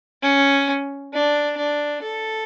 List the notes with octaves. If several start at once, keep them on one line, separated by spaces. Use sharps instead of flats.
C#4
D4
D4
A4